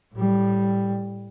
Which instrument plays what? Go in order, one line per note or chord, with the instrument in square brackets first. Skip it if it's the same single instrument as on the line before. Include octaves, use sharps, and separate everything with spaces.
[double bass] A2 G3